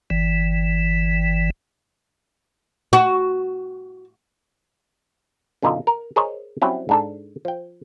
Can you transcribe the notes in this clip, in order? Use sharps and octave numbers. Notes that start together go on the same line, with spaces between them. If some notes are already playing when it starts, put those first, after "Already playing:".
G1 E3
F#4
F#2 B2 D3 D#4 F4 D#5
A#4
G#4 A#4 C5 C#5 D#5
F#3 G3 C4 C#4 E4
G#2 D4 A4
F3 G5